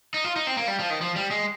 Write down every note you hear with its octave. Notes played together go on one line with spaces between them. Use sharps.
D#4
F4
D#4
C4
A#3
G3
F3
D#3
F3
G3
G#3